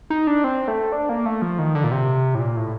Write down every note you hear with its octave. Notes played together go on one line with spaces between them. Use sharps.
D#4
D4
C4
A3
D4
A#3
A3
F3
D#3
D3
A#2
C3
A2
A#2
A2